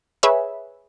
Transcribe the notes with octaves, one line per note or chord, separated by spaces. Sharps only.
G#4 B4 C#5 E5